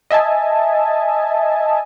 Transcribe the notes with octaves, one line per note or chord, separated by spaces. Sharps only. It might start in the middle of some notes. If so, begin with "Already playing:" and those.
D#5 E5 G#5 A5